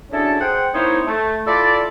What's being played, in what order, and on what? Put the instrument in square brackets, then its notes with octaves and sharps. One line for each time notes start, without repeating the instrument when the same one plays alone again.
[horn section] C#4 D4 E4 F#4 G#4 A4
G#4 C5 F#5 G5
A#3 C4 D#4 E4 C5 C#5
A3
E4 F4 A4 D5